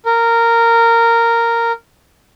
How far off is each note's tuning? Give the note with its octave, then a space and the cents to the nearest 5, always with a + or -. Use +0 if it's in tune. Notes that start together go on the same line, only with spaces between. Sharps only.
A#4 -10